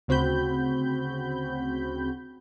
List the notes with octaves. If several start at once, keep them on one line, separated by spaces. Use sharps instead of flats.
D2 C#3 C4 F#4 B5 G6